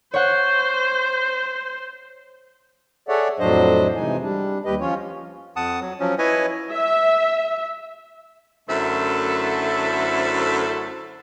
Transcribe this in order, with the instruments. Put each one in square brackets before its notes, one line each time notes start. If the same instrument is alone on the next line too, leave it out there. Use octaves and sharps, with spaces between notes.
[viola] C5 [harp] C#5 F#5
[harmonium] G#4 A4 C#5 D5 E5 F#5
F2 A2 F#3 D4 C5 D#5
C3 E3 G#3 D#4 G#5
G3 D4
D#2 G3 G4 B4 D#5
F3 C#4 F4 C#5
[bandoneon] F2 F#5 A5 D#6
F#3
F3 F#3 C#4
E4 B4 C#5 D#5 G#5
[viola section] E5
[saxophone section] F#2 D3 A3 E4 A4 C5